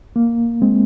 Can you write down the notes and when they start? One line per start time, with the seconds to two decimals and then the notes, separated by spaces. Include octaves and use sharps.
0.16 A#3
0.62 G#3 C4